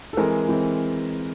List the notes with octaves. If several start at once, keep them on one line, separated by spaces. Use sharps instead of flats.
A4
E3 G#3 C4 A#4
E3 G#3 C4